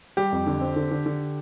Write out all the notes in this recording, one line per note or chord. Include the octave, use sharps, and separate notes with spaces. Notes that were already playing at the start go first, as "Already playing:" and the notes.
G3 G4
F2
D3
C4
D3
D3
D3